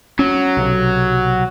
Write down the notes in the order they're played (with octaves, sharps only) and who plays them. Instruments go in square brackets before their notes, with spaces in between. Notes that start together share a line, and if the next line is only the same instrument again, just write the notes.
[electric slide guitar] F#3 [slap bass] C#4
[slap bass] B1 C3